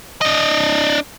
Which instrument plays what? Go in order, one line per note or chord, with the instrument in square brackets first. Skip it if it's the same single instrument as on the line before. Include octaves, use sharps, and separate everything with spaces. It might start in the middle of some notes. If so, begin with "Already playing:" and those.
[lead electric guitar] D4 D#5